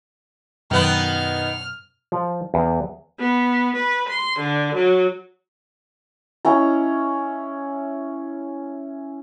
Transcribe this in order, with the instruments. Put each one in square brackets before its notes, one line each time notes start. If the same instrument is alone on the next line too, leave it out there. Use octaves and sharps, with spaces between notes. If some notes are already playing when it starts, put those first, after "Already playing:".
[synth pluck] F#2 B2 F#3 [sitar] D#3 B3 [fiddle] F6
[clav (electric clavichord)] F3
E2
[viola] B3
B4
C6
D3
F#3
[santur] C#4 E4 A#5